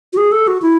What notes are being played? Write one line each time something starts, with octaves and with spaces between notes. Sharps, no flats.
F#4
G#4
A4
F#4
E4